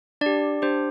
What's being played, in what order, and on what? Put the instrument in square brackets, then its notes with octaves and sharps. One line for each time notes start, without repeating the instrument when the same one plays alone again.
[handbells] D4 G4 D5
D4 G4 C5